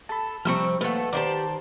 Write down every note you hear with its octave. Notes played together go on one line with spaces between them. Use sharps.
A4 A5 B5
C3 F3 G3 C4 C#6 E6 F6
D#2 A2 A3 A4 B4 F#5
D#3 G4 C5 D5 A5